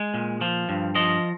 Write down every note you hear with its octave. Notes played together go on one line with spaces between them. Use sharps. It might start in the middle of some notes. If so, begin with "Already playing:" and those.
Already playing: G#3
A#2
F3
G2
F3 D#5